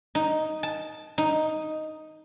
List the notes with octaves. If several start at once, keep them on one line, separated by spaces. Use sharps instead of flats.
D#4
A5
D#4